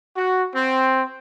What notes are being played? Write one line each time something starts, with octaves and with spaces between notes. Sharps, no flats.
F#4
C4